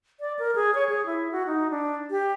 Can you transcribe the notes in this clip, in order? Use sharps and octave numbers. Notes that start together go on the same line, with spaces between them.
D5
A#4
G#4
C#5
G#4
E4
F#4
D#4
D4
G4